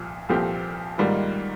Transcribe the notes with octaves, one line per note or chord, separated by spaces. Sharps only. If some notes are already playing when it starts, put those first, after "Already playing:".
Already playing: C2 A#2 F3
C2 A#2 F3 C4 G4
G#2 D#3 G3 A#3 F4